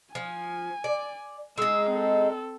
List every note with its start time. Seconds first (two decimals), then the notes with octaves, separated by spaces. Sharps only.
0.15 F3 G#5
0.84 D5
1.58 G#3 D#4 E6
1.90 C4 A4